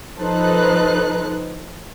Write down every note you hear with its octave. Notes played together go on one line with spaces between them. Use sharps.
F3 D#4 A4 B4 C5 F#6